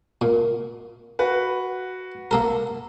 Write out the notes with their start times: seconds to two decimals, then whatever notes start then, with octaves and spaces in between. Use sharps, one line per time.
0.21 A#2
1.19 F#4 B4
2.31 A#3 A4 A#4